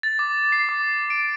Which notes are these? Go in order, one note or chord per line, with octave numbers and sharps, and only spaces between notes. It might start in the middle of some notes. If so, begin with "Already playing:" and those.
A6
D6
C7
D6
D7